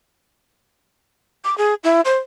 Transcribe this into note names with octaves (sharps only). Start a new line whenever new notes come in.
D6
G#4
E4
C5